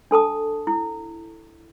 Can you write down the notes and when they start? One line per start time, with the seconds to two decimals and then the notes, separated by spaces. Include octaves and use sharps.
0.11 D4 A4 A5 D#6
0.67 E4